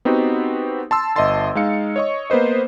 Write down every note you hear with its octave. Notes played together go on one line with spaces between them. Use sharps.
B3 C4 D#4 F#4 G4
A5 C6 E6
G1 D#5 E5 A5 C6 A6
G#3 D#4 F5 C#7
C#5 D#5 C#6
A#3 B3 B4 C5 D#5